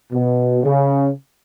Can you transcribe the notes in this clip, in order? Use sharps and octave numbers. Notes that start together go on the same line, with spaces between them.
B2
C#3